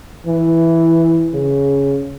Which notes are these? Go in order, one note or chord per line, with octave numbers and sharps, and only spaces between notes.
E3
C#3